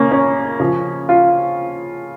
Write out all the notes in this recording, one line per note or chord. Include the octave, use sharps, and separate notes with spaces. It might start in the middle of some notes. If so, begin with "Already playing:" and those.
Already playing: C#3 A#3 C#4
C#4
C#3 F3
F4